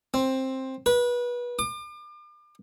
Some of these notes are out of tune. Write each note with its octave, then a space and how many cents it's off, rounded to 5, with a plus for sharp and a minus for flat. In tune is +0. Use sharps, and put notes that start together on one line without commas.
C4 +10
B4 -25
D6 +40